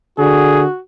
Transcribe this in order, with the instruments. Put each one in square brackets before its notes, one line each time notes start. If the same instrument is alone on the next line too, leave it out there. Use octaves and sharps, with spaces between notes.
[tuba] D3 [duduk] F#4 [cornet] G#4